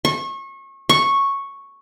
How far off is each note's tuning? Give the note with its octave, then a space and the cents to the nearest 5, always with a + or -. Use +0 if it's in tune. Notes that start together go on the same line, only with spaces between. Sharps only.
C#6 -30
C#6 -5